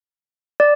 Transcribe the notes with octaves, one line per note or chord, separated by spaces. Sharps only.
D5